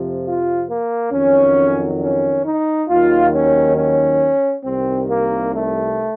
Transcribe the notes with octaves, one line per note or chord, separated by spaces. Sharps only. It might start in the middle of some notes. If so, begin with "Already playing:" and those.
Already playing: F2 C3 F3
F4
A#3
F2 D#3 F#3 C#4
C#4
D#4
D#2 D#3 F#3 F4
C#4
C#4
C2 C3 D#3 C4
A#3
A3